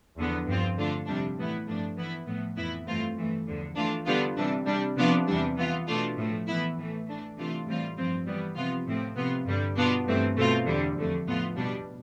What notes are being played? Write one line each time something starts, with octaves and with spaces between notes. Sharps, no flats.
E2 D3 F3 B3
G2 F3 C4 F4
D3 A3 D4 F4
F2 C3 G3 D4
A2 E3 B3 E4
G2 F3 A3 D4
E3 B3 E4
A2 F3 B3
F2 E3 B3 E4
G2 E3 A3 C4 F4
G2 E3 A3
E2 D3 F3
E3 A3 D4 F4
D3 G3 B3 D4 F4
C3 E3 G3 D4
C3 G3 D4
C3 F3 B3 D4 F4
E2 C3 E3 G3 D4
E3 B3 F4
B2 A3 D4 F4
A2 F3 A3
E3 B3 E4
A2 E3 A3
E3 A3 D4
C3 E3 A3 D4 F4
A2 E3 G3 C4 F4
G2 F3 C4 F4
E3 G3 B3
C3 F3 B3 F4
A2 F3 C4
C3 F3 B3 F4
G2 D3 G3
B2 B3 D4 F4
G2 E3 A3 C4
B2 A3 C4 F4
E2 D3 G3
F2 D3 A3
A2 F3 B3 F4
B2 G3 D4